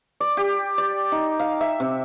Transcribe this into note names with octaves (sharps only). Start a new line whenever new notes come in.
D5
G4
D5
D#4
F5
E5
C3